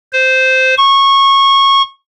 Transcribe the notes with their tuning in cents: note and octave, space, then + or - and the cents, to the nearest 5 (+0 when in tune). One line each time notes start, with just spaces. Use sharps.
C5 -10
C#6 -20